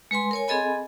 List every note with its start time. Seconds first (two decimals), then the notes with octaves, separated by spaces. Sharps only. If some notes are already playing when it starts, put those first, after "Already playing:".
0.11 G#3 B4 G#5 C6
0.31 A#4 C#5 G#5
0.48 C4 G#4 A4 D#5 G#5 B5